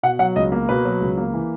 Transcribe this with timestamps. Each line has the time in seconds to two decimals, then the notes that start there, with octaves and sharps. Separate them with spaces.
0.03 B2 F#5
0.19 F#3 F#5
0.36 C#2 D#5
0.52 A#3
0.69 B2 B4
0.85 F#3
1.01 C#2
1.17 A#3
1.34 E3